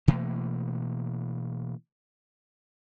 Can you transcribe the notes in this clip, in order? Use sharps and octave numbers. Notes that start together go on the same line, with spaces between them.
B2 E3 A3 A#3